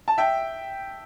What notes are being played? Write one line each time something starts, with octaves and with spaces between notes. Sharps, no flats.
A5
E5 G5